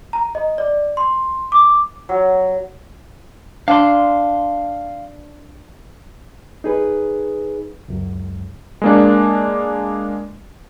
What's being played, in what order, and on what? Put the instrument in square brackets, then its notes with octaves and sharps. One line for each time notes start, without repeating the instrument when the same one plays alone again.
[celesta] A#5
D#5
D5
C6
D6
[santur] F#3
[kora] D4 [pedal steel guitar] F5 C6
[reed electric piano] D#4 G#4 B4
C#2 F#2
[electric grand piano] G#3 A#3 D4